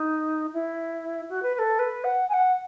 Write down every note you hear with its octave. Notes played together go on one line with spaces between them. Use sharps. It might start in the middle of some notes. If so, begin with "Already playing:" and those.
Already playing: D#4
E4
F#4
B4
B4
A4
B4
F#5
G#5
F#5